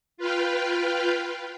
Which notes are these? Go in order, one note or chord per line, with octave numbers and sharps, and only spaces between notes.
F4 B4 F5 G5